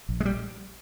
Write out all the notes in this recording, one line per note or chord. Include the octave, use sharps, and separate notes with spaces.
A#1
G#3
G3